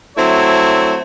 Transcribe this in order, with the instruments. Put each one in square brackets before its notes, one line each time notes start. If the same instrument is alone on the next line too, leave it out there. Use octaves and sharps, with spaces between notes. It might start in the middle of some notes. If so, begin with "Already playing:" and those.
[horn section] F#3 A3 C4 E4 C#5